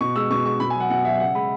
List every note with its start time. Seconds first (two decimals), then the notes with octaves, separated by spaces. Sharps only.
0.01 B2 C#6
0.16 G#3 E6
0.31 B2 C#6
0.45 G#3 C#6
0.60 B2 B5
0.70 G#5
0.75 F#3 F#5
0.90 B2 F#5
1.05 F#3 E5
1.20 C#3 F#5
1.35 G#3 B5